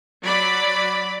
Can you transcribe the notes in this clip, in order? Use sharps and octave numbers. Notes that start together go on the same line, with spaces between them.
F#3 D5 B5